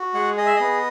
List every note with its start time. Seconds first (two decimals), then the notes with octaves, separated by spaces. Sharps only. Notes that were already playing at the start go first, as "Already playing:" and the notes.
Already playing: F#4
0.14 G#3 F#5
0.37 G#4 D#5
0.46 E5
0.56 B3 D#5